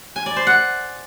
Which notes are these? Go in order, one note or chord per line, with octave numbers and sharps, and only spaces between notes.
G#5
D5
C5
F#5